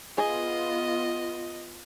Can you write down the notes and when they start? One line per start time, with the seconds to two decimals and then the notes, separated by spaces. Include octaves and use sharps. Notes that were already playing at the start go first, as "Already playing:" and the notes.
0.18 B3 F4 G#4 D#5